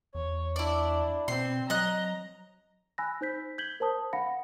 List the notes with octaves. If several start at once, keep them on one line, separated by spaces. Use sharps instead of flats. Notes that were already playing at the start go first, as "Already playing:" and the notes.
E2 C#5
D4 E4 D5
B2 C4 C6
F#3 D#5 A#5 F#6
G#5 B5 E6 F#6 A#6
D#4 C5 G6 B6
G6 G#6 B6 F#7 G7
A#4 C5 A5 D#6
F5 F#5 B5 A#6 C#7